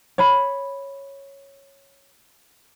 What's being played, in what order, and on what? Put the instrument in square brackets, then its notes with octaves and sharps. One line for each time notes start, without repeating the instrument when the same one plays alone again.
[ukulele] C#5 B5